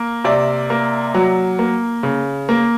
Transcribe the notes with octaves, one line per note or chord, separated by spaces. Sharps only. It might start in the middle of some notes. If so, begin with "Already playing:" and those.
Already playing: A#3
C3 D5 E5
A#3
F#3
A#3
C#3
A#3